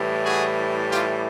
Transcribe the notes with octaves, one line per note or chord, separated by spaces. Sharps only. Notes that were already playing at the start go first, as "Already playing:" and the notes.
Already playing: A2 E3 G3
F#4 G#4
F4 G4